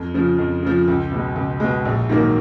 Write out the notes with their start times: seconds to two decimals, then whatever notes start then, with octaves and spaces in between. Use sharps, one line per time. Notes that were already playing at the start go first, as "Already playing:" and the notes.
Already playing: F2
0.14 C#3 F3
0.38 F2
0.63 C#3 F3
0.88 C#2
1.12 B2 G#3
1.36 C#2
1.60 B2 G#3
1.85 A#1
2.09 G#2 D#3 F#3 A#3